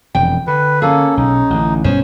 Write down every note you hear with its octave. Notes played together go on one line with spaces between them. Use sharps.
E1 F2 G5
D3 B4
A#3 C#4 G#4 A4
B1 D#4
A1 D3
B1 G2 B3 C#4 C5